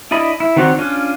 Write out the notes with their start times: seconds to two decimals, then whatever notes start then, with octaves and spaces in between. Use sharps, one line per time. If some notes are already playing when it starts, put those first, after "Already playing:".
0.11 D4 E4 D5 D#5 B5
0.40 E4
0.57 D#3 C4 F#4 C#5 D5
0.78 C#4 D4 F4